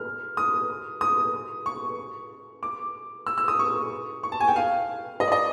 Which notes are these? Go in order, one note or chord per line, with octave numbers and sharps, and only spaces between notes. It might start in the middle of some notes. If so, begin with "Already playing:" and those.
Already playing: F6
D#6
D#6
C#6
D6
E6
E6
D#6
C#6
C#6
A5
G#5
G5
F5
D#5
D5
D#5